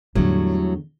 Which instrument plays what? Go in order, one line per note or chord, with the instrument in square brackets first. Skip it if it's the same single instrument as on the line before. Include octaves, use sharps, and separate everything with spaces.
[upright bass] E2 D3 [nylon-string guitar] A2 F#3 G3